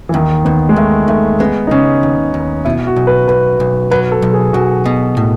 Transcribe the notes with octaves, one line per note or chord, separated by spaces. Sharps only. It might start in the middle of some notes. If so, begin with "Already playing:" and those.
E3
D#2 D#3
D#2 B3
G#3
D#2 A3
D#2 A3
G#3 B3
D#4
C#3 C#4
D#2
D#2
B2 E4
F#4
B1
B4
B1 B4
B1
F#3 B4
A4
B1
G#4
B1 F#4
B2
A2